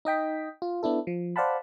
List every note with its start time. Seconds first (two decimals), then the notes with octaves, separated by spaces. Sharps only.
0.05 D#4 D#5 G5 B6
0.62 F4
0.83 B3 D4 E4 A4
1.07 F3
1.36 C5 D5 F5 F#5 A5 B5